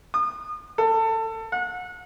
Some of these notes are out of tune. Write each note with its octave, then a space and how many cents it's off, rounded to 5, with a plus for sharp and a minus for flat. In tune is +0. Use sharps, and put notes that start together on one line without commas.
D#6 -35
A4 +25
F#5 -35